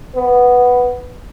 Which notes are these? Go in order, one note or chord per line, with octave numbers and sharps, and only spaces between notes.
B3